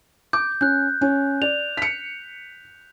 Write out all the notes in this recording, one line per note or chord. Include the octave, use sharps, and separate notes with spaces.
D6 G6
C#4 F#6 G6
C#4
D5 F7
B6 C#7